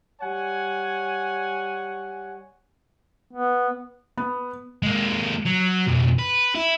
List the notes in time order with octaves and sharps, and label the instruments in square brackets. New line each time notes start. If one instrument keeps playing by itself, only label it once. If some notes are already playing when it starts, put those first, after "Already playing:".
[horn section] G3 C#5 F#5 G#5
[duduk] B3
[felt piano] B3
[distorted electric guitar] G#3 A#3
F#3
B1 F2
B4
E4